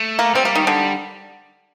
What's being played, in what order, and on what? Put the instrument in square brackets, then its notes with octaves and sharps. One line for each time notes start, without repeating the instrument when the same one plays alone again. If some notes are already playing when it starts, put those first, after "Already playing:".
Already playing: [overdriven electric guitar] A3
[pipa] A#3
[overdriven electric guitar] G3 [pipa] C4
[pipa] A#3
D#3
D3